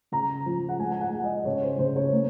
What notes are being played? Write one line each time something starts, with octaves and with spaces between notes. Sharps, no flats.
C#3 A#5
F3
F#5
G#3 G#5
G#5
F#5
G#3
D#5
C#3 C#5
C5
C#3 C5
C#5
A#3